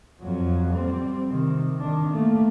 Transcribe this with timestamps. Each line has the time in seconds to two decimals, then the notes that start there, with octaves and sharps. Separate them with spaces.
0.21 F2 F#3
0.70 G3 C4
1.30 C3 D#3
1.79 D#3 D4
2.10 A3 A#3